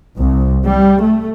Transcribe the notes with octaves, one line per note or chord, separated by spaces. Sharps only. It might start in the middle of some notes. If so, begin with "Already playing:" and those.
C2
G3
A3